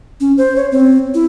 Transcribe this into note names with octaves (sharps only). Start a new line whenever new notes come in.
C#4
C5
C#5
C4
E4